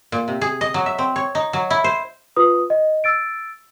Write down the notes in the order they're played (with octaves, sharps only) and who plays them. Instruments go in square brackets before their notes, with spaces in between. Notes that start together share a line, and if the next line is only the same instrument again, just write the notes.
[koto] A#2
C3
G#4
D#5
F#3
E5
C4
C#5
D#4
F#3
E4
C5
[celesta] F4 B4 D#6
D#5
E6 A6 D7